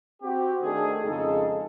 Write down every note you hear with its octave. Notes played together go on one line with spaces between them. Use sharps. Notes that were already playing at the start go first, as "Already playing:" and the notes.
C4 F#4 G4
D#3 A3 D4 G#4
F2 C#3 G#3 D#4 G#4 A4